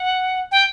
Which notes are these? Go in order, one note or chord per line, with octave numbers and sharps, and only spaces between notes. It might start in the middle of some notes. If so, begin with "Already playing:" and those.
Already playing: F#5
G5